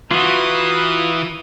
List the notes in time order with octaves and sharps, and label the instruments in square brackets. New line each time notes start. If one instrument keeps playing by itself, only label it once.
[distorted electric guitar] E3 [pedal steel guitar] F4 F#4 [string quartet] A#5 B5 D#6